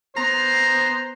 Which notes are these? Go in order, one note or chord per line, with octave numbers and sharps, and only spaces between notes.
B3 C5 A#5 C7